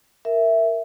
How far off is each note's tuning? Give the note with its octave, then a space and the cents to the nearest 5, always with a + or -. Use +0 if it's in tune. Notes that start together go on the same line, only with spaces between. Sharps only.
A#4 -10 E5 +0